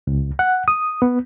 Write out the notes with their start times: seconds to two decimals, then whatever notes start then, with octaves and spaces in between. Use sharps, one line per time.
0.07 C#2
0.39 F#5
0.68 D#6
1.02 B3